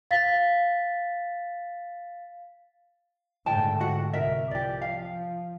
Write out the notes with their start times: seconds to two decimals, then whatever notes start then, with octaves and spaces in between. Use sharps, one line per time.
0.11 F5 A6 B6
3.46 G#2 D3 A3 G5 A5
3.80 F#4 F#5
4.13 C2 A#4 E5
4.51 F3 G4 D5
4.82 F5